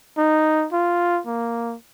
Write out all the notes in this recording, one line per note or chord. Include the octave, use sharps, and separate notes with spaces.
D#4
F4
A#3